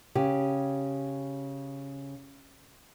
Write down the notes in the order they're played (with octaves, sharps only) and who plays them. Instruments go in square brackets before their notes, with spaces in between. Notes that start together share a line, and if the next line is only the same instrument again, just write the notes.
[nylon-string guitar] C#3 G4